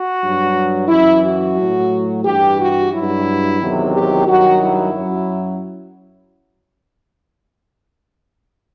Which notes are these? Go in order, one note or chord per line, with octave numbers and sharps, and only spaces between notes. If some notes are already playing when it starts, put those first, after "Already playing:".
Already playing: F#4
G2 F#3
F#2 E3 E4
F#4
A2 F#3
G2 E3 G4
F#4
G2 F#3 E4
E2 C3 D#3 F#3
G4
G2 D#3 F#3 F#4
E4
F#2 F#3